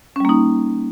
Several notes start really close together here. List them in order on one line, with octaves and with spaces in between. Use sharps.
C#4 G3 A#3 D#4